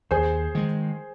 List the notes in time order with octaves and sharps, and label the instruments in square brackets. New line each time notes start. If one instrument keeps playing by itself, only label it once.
[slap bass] D#2 [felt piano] G#4 C5
[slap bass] D#3 G#3